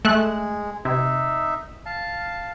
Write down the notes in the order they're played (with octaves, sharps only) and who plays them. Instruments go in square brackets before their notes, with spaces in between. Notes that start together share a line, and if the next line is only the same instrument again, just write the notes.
[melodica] G#3 [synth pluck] A3 E5 F#6
[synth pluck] C3 [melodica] D#4 E5
[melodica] F5 A5